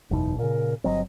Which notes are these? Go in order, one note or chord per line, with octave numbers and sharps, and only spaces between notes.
F#1 E2 B2 D#4
A#2 C#3 A#4
G1 F#3 C4 D#5